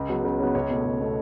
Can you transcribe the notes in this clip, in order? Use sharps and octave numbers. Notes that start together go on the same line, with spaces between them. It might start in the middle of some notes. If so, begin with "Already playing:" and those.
Already playing: C#2
C#3 F#3 B3
C#2
C#3 F#3 B3
C#2 C#5
B2 A3
C#2
B2 A3